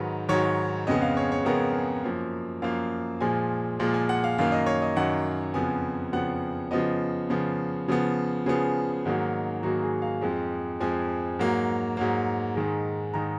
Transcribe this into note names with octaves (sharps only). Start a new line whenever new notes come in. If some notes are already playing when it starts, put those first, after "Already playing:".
Already playing: G#2 D#3 F#3 B4
G#2 D#3 F#3 C#5
F2 C#3 G#3 B3 D#5
F5
C#5
C#5
F2 C#3 G#3 B3 A#4
F#2 F3 A#3
F#2 F3 A#3 F5
A#2 F3 G#3 G#5
A#2 F3 G#3
G#5
F#5
F5
F#2 D#3 A#3 F5
D#5
C#5
D#5
F#2 D#3 A#3 F#5
F2 C#3 F3 B3 G#5
F2 C#3 F3 B3 F#5
C#3 F3 B3 D#5
C#3 F3 B3
C#3 F3 B3
C#3 F3 B3 G#4
G#2 D#3 F#3 A#3
G#2 D#3 F#3 A#3 F#4
G#4
F5
F2 F3 G#3
F2 F3 G#3 G#5
G#2 F#3 A#3
G#2 F#3 A#3
G#2 D#3 G#3
G#2 D#3 G#3 A#5